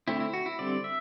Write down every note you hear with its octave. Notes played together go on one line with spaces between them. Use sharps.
D3 A3 C4 E4
E4
F#4
E4
D3 G3 C4 D5
E5